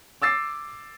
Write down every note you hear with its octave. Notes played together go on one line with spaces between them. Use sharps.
D6 E6 A6 C7